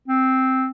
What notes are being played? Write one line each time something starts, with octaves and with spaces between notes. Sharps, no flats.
C4